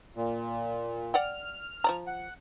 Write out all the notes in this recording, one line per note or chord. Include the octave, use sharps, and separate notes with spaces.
A#2
D5 F#5 G5 F6
F3 D5 A#5
F#5